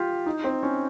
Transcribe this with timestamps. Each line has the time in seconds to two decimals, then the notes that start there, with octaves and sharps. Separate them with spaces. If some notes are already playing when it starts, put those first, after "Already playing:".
Already playing: F4 G4
0.26 D#4
0.44 C4
0.63 C#4